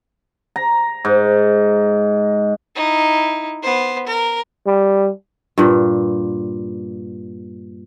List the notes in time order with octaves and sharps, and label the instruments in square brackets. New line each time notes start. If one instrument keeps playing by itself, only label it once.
[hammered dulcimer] A#5
G#2
[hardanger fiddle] D#4 E4
B3 C5
A#4
[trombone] G3
[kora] G2 A#2